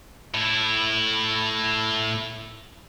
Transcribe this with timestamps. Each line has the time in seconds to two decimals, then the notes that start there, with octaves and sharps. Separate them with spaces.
0.34 A2 E4